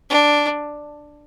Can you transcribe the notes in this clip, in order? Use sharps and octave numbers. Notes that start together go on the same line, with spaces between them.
D4